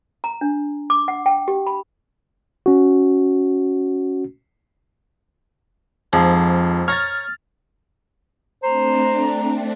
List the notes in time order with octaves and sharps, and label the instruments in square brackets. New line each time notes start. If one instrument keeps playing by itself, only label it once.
[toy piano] A#5
D4
D6
F#5
G5
G4
B5
[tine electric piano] C#4 F#4
[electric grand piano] F2 [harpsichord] G#2 F3
[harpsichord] C#5 A#5 C#6 [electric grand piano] F6 A6
[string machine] A3 C4 D4 [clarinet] C5 [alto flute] A#5